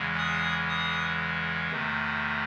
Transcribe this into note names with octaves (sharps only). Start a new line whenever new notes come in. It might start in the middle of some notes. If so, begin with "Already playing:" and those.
Already playing: E2 C#3 E3 G#3
D#6
D#6
E2 C3 D#3 A3